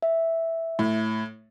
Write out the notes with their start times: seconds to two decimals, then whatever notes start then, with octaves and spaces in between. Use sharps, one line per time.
0.03 E5
0.79 A2